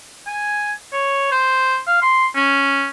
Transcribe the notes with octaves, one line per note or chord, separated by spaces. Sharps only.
G#5
C#5
C5
F5
C6
C#4